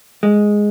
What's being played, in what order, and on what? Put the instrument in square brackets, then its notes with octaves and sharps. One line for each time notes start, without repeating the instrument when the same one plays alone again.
[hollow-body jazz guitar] G#3